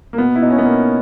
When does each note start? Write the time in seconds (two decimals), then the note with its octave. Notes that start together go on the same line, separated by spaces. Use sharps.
0.13 A#3
0.18 B2 B3
0.36 E4
0.42 B2 D#4
0.50 C#4
0.58 B3
0.65 B2 A#3